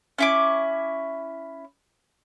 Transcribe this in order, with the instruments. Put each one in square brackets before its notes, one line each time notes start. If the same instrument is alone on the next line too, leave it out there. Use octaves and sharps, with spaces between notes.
[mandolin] C#4 E4 D6